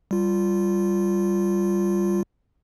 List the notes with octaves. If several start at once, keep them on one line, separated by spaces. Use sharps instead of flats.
G3 F4